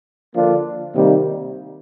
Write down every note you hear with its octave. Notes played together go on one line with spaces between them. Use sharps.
D3 F3 A#3 D4 F4
C3 D#3 G3 A#3